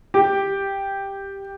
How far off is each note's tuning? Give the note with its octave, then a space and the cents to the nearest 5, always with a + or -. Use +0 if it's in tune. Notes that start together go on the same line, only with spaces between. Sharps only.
G4 +5